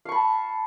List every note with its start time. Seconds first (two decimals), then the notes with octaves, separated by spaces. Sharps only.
0.05 F5
0.09 C#6
0.12 B5
0.15 A5